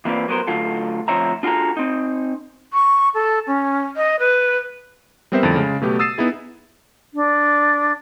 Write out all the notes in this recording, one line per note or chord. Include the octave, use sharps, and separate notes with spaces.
E3 A#3 C4 F4 B4 D5
F#3 B3 A#4 C5
D3 F#3 A3 F4 A4
D2 F3 C4 C#5 E5 A#5
D4 F4 F#4 G#4 A4 A#5
C4 D#4
C#6
A4
C#4
D#5
B4
G3 B3 C4 A#4 C5 E5
F2 A2 D3 A6 D7
C#3 G#3
B2 F#3 A3 B3 G4
D#6 E6 A6 C7 D#7 E7
B3 D#4 E4 G#4
D4